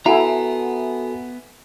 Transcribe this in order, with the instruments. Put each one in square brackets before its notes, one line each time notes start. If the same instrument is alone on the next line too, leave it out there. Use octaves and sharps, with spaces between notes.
[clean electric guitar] B3 A#5 [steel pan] E4 [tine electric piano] F#4 A4 [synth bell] E5 F#5 G#5